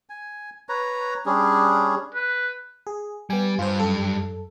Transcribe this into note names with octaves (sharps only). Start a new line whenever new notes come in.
G#5
B4 C#5 A#5
G3 C#4 D4 G#4
B4
G#4
G3 B3 G#5
G2 F4 C5
F#2 A4